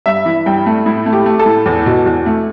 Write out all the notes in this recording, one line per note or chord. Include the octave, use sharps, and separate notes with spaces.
G2 E5
E3
G2 G5
A3
A2 E4
A3
G4
A3
A4
A2
E2
B2
E2
A3